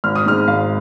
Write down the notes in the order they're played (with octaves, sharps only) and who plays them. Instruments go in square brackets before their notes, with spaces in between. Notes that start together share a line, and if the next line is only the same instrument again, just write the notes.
[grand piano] G#1 F6
D#6
G#2 G#3 C4 F6
G#1 F5